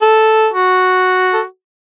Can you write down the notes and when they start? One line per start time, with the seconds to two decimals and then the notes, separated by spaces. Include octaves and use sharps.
0.02 A4
0.53 F#4
1.34 A4